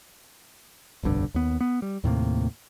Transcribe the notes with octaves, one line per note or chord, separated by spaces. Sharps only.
F1 B1 G2 D3
D#2 B3
B3
G3
D#2 A2 C3 A#3